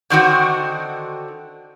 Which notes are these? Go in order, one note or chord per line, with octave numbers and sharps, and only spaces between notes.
D3 D#3 C4 F#4